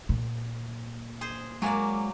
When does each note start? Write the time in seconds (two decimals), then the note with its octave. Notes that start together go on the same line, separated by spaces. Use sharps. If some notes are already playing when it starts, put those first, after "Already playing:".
0.09 A#2
1.21 G#4 C5
1.62 F#3 G#3 A#3 D5 G#5